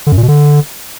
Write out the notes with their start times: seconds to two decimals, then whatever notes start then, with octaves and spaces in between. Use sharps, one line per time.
0.07 D3
0.12 F#2
0.17 A#2
0.23 B2
0.28 D3